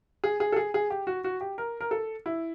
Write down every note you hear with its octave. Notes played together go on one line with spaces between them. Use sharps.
G#4
G#4
A4
G#4
G#4
G4
F#4
F#4
G4
A#4
A#4
A4
E4